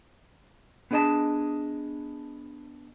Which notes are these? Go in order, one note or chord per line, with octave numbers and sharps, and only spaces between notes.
B3 D4 G#4 D5 D#5 A5